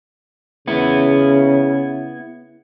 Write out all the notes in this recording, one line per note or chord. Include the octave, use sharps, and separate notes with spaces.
C#3 B3 E4